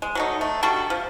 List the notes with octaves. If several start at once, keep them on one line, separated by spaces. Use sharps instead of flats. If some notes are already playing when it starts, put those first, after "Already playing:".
G#3
F#3 A3 D#4
A3
G3 D4 F#4 A4
F3